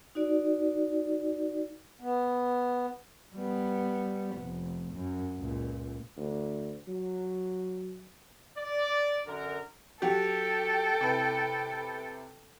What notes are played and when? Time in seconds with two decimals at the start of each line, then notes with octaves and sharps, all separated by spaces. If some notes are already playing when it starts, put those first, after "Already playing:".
0.15 D#4 F#4 D5
2.00 B3
3.35 G3 B3
4.37 F1
4.94 F#2
5.38 C#2 A#2
6.17 D2
6.88 F#3
8.56 D5
9.26 F#2 D3 A#4
10.02 F#3 F#4 G4 A4 G5
11.01 C3 E4 B4